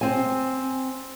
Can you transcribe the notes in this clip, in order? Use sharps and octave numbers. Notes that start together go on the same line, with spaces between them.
C4 G#5